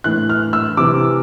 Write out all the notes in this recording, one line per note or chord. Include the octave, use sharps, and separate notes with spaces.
A2 E3 F#6
F6
E6
C3 E3 D6